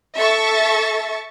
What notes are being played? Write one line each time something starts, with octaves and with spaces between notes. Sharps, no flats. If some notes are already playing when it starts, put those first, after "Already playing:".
A4 E5 C#6 A6